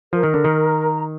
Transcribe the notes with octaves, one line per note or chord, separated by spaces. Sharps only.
F3 A#4
D#3
D3
D#3
A#5